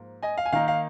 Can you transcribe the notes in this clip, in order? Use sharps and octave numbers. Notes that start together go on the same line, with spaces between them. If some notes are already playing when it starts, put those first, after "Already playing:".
Already playing: G#2 F3 A#3
D#5 G#5
F5
G#5
D#3 A#3 D#4 F5
F5